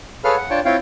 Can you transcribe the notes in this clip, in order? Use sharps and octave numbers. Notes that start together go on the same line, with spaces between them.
G#4 A4 B4 C#5 F5 F6
F#5
D4 F4 C#5 G5 A5
C4 E4 F4 C#5 F5 G5